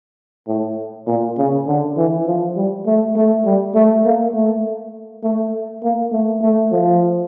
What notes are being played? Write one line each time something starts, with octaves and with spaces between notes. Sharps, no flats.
A2
A#2
C#3
D3
E3
F3
G3
A3
A3
G3
A3
A#3
A3
A3
A#3
A3
A3
F3